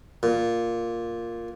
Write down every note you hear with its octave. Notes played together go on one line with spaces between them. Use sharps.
A#2